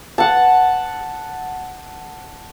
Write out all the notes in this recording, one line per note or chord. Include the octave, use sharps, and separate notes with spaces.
F#5 A5